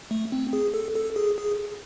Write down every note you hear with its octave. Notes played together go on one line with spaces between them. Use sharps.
A3
C4
G#4
A4
A4
G#4
G#4